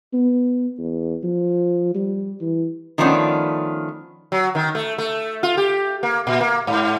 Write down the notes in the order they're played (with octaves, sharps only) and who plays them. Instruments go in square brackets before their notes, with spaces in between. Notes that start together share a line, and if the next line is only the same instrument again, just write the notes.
[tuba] B3
E2
F3
G3
E3
[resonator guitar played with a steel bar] D#3 F3 A3 B3 C#4 D4
[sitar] F#3
D#3
A3
A3
F4
G4
A#3
A#2
A#3
G#2